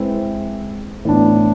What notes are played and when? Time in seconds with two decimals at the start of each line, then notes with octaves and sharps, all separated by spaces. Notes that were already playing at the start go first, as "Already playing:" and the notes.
Already playing: G#3 C4 E4 B4 E5
1.05 A2 E3 B3 D4